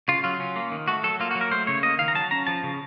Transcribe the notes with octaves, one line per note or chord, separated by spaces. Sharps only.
C#3 F4
F#3 F4
C#4
A#3
D#3
A3 F#4
F#3 A4
A#3 F4
F#4
F#3
A#4
A3 C5
C#3 C#5
A#3 D#5
D#3 F5
A#5
F#3 A5
C#4 A#5
F3 A5
C#3